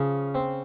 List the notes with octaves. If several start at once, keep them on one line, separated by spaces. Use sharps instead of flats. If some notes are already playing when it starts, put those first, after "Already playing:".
Already playing: C#3 F3
C4